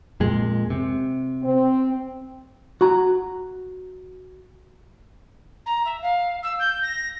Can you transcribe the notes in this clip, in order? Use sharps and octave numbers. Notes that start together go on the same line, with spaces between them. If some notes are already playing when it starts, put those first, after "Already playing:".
F2 A#2 G#3
C3
C4
F#4 A#5
A#5
E5
F5
E6
G6
A#6